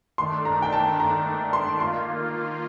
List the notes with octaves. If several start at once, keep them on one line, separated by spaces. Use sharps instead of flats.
D#3 A3 D4 C6
A#5
G5
A5
A#5
C6
D#3 A#3 F4 C6